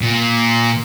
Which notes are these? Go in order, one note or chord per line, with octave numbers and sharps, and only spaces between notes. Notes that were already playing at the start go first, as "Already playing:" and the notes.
A#2